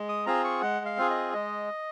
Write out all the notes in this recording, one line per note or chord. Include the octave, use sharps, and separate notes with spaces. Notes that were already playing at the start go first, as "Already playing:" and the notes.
Already playing: G#3
D#6
C4 F4 G#4 A#5
C#6
G#3 F#5
F5
C4 F4 G#4
D#5
G#3 D#5